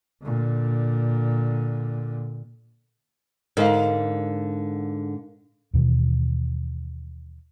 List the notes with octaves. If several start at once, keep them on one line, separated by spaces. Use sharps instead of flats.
A#2 D3
G#2 D3 A#4 F5
D#2 B2 D#3 E3